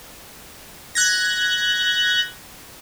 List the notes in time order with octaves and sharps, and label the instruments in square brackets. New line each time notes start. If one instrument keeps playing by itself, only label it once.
[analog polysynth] F#6 G#6 A#6